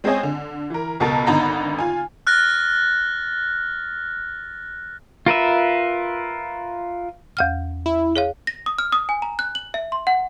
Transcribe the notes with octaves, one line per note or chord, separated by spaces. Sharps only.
G#3 C4 C#4 C#5 D#5 G#5
D3
E3 A#4
C#2 B2 B3 A4 A#4 A6
G#1 D3 B3 D#4 A#5 B5
F4 G#5
F6 F#6 A6 A#6
F4 A#4 B4 E5
E2 F#5 F6
E4
G#4 C#5 F5
A#6
D#6
F6
D#6
G#5
A#5
F#6
F#7
E5
C6
F#5